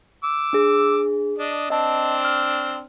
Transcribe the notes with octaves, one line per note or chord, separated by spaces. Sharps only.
D6 E6
D4 G#4
D4 D#5
C4 D4 D#5 A5
F6